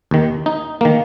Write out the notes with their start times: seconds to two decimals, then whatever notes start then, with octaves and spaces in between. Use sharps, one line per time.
0.11 D#2 D#3
0.46 D#4
0.81 D#3 A#3